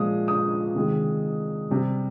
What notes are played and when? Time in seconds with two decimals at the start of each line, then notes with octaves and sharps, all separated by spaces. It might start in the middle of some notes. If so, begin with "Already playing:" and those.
Already playing: A#2 F3 G#3 D#6
0.28 D#6
0.75 C3 D#3 G#3
1.70 C3 G3